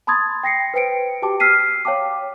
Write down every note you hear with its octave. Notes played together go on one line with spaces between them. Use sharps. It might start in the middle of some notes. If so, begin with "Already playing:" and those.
A5 B5 C6 D#6 G#6 A6
G5 A#6 C7 C#7
B4 C5 G5 C#7 D7
F#4 G4 G5 A5 D6
E6 F6 B6 C7 D#7
C#5 F5 G5 A5 D6